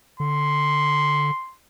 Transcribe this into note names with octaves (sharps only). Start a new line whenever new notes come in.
D3 C6